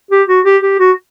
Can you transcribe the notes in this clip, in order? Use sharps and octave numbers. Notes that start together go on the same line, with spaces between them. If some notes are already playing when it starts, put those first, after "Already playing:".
G4
F#4
G4
G4
F#4